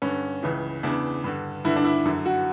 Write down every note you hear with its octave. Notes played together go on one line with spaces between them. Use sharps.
G2 D3 C#4
C#2 C#3 E3
E2 C#3 E3 D4
G2 D3
G2 D3 E4
D4
E4
F#2 D3
F#4